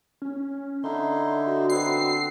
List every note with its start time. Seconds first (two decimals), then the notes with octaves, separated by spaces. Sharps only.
0.22 C#4
0.84 D3 D#4 E4 C6
1.47 F#4
1.69 B3 C4 C7